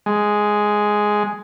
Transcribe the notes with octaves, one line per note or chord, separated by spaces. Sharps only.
G#3